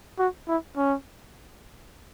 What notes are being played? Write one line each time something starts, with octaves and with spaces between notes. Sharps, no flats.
F#4
E4
C#4